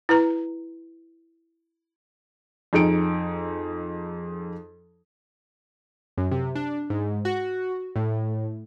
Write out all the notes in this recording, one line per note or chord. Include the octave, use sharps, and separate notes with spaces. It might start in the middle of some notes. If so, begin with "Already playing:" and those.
E4 B4 A#5
F2 D#4 G#4 C#7 D7
F#2
C3
D4
G#2
F#4
A2